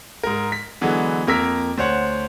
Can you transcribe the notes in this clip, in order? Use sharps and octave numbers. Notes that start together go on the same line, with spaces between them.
G#2 A#4
B6
D3 E3 F#3 G#3 B3
F2 A#3 A#4 E6 B6
D2 C5 C#5 F#5